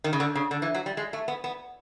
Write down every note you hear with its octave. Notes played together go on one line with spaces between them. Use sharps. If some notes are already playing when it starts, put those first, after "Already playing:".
D#3
C#3
D3
C#3
D3
E3
F#3
G3
G#3
A3
B3
B3